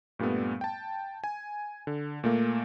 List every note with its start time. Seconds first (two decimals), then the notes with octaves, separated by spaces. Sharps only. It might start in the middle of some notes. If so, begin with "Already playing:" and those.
0.19 G2 A#2 G3 A3 B3
0.61 G5 A5
1.24 G#5
1.87 D3
2.24 A#2 A3 A#3